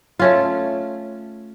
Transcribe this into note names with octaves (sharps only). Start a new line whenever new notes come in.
A3 C#4 F4